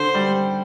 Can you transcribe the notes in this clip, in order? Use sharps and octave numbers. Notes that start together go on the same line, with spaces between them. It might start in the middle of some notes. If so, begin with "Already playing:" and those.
Already playing: D3 C5
G3